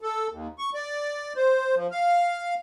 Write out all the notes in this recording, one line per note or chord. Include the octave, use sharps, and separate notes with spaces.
A4
D#2
C#6
D5
C5
F3
F5